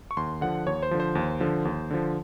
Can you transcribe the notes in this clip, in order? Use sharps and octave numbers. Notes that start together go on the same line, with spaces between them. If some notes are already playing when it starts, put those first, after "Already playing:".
C#6
D#2 C6
D3 F3 F#5
D#2 C#5
C5
D3 F3
C5
D#2
D3 F3
D#2
D3 F3